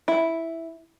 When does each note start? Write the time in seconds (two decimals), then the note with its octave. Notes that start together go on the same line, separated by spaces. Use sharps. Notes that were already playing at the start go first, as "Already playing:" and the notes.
0.08 E4